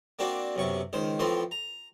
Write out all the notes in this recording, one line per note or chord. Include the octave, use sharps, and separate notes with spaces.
A#3 C4 D4 F#4
B1 F#2 C3 C#6
C#2 D#3 C5
A2 E3 F3 C4 C6
A#5